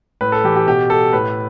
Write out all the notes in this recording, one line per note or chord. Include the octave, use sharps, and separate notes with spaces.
A2 B4
A4
E3 G4
G4
B2 G4
A4
A2 B4